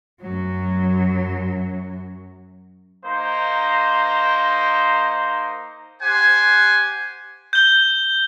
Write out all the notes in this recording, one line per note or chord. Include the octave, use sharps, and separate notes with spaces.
F#2 F#3
A#3 D#4 C5 A#5
G4 C5 F#5 G#5
G6 G7